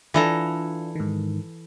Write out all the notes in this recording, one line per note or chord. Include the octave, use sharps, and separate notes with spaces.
E3 D4 F4 A4 A#5
G#2 D#3